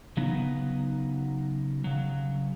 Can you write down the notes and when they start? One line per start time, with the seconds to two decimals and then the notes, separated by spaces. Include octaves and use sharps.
0.17 C#3 F#3 B3 D#4
1.84 C#3 F#3